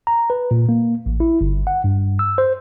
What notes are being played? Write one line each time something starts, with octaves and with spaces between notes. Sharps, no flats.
A#5
B4
A#2
A#3
A1
E4
G1
F#5
G2
E6
C5